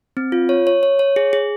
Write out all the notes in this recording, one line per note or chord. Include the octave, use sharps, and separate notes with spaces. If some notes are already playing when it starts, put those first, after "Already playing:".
C4
F4
C#5
C#5
C#5
C#5
G#4
G#4